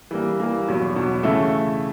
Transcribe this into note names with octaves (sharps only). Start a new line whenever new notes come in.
E3 G3 A#3
E3 G3 A#3
E2 B2 F#3
E2 B2 F#3
C#3 E3 A3 C#4 E4